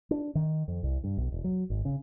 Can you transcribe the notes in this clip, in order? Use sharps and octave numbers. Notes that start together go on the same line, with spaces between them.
D4
D#3
F2
C2
G2
B1
E1
F#3
G#1
C#3